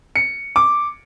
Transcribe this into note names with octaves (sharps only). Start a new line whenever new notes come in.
C#7
D6